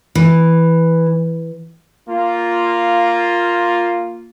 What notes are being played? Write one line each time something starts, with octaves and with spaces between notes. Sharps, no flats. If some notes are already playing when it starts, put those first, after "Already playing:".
E3
A#3 F4